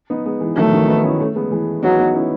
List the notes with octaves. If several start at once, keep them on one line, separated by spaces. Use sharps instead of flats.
B3 D#4
G#3 B3
E3 G#3
D#3 F#3 A3
D#3 F#3
B3 D#4
C#4 E4
A3 C#4
G#3 B3
E3 G#3
F#3 B3 D#4
B3 D#4
C#4 E4